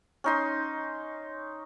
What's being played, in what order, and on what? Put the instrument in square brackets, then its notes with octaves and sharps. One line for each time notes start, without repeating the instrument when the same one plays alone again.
[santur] C#4 D#4 C6